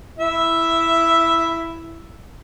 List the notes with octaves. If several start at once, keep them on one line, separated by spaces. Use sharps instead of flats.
E4 E5